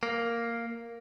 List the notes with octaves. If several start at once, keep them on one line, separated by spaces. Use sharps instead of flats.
A#3